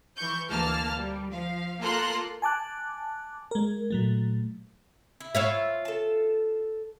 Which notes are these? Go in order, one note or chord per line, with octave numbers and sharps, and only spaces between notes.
E3 C#6 G6
D2 E3 A#3 A5 F6
G3
F3 F5
A#3 F4 A4 A#5 C6 F#6
G#5 A5 D6 F#6
G#3 A#4
A#2 F#3 A3
E4
F4 C#5 E5
A4 A5